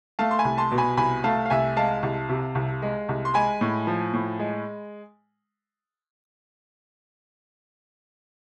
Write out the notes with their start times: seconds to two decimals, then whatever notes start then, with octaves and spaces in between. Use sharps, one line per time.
0.19 A3 F5 A5
0.31 C6
0.39 G#5 B5
0.45 C2
0.58 A5 C6
0.71 B2
0.78 G#5 B5
0.97 C2 G#5 B5
1.24 A3 F5 A5
1.45 F5
1.50 C2 E5 G#5
1.76 G#3 F5 A5
2.03 C2
2.29 C3
2.55 C2
2.82 G#3
3.09 C2
3.25 C6
3.34 G#3 G#5 B5
3.61 A2
3.87 F3
4.13 A2
4.39 G#3